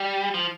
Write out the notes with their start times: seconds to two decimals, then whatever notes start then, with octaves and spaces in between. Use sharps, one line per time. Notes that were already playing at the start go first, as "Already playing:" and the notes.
Already playing: G3
0.34 F3